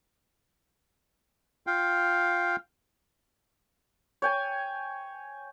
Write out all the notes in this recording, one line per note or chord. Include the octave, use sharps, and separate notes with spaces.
F4 F5 G5
C#5 G5 G#5